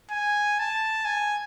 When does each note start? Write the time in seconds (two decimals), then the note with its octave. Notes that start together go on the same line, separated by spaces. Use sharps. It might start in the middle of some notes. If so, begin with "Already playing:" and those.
0.11 G#5
0.59 A5
1.05 G#5